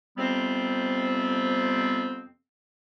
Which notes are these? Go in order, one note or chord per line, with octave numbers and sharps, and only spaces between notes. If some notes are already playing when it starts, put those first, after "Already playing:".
F2 C3 G3 B3 C4